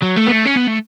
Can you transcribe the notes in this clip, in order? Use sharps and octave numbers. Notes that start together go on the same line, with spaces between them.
F#3
A3
B3
A3
C#4
B3
A3